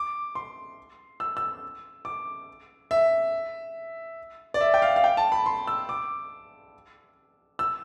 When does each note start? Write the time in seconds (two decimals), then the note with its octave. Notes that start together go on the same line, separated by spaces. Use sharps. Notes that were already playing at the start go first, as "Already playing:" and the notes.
Already playing: D6
0.35 C6
1.20 E6
1.37 E6
2.05 D6
2.91 E5
4.54 D5
4.61 E5
4.74 G5
4.82 F5
4.96 F5
5.04 G5
5.17 A5
5.32 B5
5.46 C6
5.67 E6
5.89 D6
7.59 E6